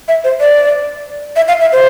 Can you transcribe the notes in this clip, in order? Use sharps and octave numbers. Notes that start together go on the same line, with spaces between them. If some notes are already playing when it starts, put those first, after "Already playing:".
E5
C5
D5
E5
F5
E5
C5